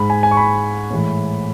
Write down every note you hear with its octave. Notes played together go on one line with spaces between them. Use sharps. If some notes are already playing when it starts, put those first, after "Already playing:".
Already playing: G#2 G#3 B5
G#5
G#5
C#6
B5
A2 E3 G#3